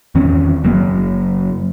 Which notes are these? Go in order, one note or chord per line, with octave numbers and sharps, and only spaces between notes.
E2 D#3 C4 C#4
F#1 F#3 A#3